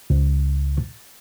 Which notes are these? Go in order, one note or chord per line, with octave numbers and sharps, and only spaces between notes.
C#2